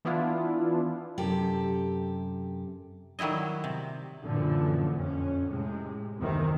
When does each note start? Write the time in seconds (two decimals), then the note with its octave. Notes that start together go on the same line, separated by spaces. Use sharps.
0.05 E3 B3 D4 E4 F4
1.18 F#2 C3 G4 A4
3.19 D#3 F#3 G3 E4 D#5
3.64 C3
4.24 F#2 A#2 D3 E3 F3
4.95 F2 C#4
5.49 A2 C3 G#3
6.19 F#1 D#2 C3 D#3 E3